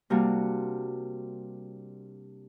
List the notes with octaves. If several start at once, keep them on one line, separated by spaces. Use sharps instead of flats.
C3 G3 A#3 D4 F#4